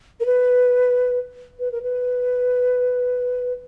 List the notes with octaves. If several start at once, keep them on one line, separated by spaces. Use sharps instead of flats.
A#4
B4
B4
A#4
B4